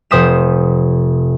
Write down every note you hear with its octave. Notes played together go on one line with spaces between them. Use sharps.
F1 C5 D#6 B6 E7